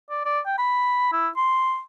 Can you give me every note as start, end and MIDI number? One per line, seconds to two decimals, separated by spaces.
0.10 0.23 74
0.25 0.39 74
0.46 0.55 79
0.58 1.12 83
1.12 1.28 64
1.37 1.80 84